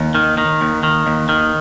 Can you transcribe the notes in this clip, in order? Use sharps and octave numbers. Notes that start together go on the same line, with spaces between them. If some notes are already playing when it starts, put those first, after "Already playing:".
Already playing: D#2
D#3
D#3
D#2
D#3
D#2
D#3